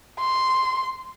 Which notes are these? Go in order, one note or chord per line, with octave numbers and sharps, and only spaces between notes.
C6